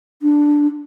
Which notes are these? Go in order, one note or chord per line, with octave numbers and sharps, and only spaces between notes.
D4